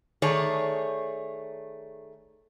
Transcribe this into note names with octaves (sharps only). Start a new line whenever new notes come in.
D#3 A3 G#4 C#5 D5